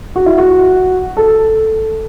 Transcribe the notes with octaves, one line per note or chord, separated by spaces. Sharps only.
F#4
E4
F#4
A4